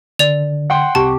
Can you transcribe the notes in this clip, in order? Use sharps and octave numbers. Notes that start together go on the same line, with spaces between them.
D3 D5 F7
F#5 G5 C6
C2 C3 G4 A5 C#6